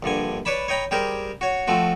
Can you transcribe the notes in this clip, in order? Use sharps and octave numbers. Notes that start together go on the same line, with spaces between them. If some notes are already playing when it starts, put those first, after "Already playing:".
A#1 G2 D3 G#5
B4 C#5 D5 A5 B5
C#5 D#5 G5 A#5 B5
G3 G4 G#4 A#4 C5
F#4 C#5
F3 A3 C4 F#4